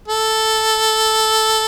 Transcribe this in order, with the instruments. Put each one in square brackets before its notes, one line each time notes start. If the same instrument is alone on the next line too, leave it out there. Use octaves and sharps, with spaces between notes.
[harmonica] A4